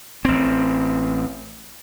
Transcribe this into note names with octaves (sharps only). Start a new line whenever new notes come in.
A1 C4